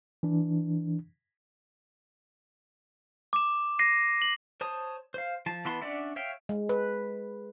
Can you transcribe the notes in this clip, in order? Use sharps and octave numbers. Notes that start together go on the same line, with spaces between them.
E3 D4
D6 E7
A#6 C7 D#7
F#7
C5 C#5 A5 D#6
C5 F5
F3 A5
E3 B3 A5 C6
C#4 D4 D5 E5 F#5
C#5 E5 F5 G5
G#3
B4